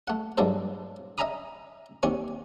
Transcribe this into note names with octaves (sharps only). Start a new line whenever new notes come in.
A3 F#5
G2 F#3 G#3 E4 A4 C5
D#5 E5 G#5 A#5 B5 D#6
D#2 C4 G#5 C#6